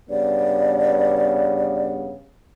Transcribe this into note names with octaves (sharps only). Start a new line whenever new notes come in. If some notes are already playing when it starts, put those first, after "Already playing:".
G2 C#3 B3 D5